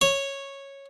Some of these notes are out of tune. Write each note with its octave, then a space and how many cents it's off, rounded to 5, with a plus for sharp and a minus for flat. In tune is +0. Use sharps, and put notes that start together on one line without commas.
C#5 -10